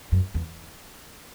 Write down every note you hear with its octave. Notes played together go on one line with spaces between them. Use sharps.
F#2
E2